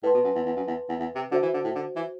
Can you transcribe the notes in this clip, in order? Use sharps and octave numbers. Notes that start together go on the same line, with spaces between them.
A2 B4 E5 A5 C6
B2
F#2
E2
E2
F#2
E2
E2
E2
C3
D3 F#4 C5 E5
E3
D3
A2
D3
E3